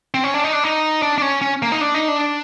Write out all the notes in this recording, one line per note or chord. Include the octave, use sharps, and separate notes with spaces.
C4
C#4
D4
D#4
D4
D#4
D4
D4
C#4
C#4
A#3
D#4
D4
D#4
D4